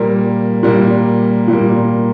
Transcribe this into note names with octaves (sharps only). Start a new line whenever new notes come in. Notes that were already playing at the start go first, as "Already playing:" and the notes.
Already playing: A#2 G3 A#3
A#2 G3 A#3
A#2 G3 A#3